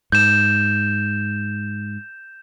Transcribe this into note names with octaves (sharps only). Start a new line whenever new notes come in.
G#2 G6 E7